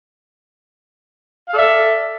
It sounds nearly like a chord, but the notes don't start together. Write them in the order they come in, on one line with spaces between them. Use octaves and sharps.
F5 A4 D5 E5